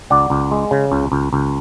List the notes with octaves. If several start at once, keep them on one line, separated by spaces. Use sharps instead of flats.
C#2 D5 F#5
C#2
G#3
C#3
C#2
C#2
C#2